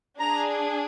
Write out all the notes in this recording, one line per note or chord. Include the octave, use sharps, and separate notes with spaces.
D4 G#4 A#5